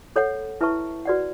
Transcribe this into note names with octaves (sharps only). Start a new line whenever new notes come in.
A4 C#5 F#5
E4 B4 E5 A5 C#6
F#4 B4 D5 F#5